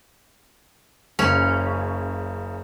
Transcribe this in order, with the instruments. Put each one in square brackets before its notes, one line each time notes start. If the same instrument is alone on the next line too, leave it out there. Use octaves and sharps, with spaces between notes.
[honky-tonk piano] F#1 C#3 F7 [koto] C#4